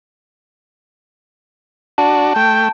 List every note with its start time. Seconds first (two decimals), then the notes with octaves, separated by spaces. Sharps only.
1.98 D4 F#4 A5
2.36 A3 G5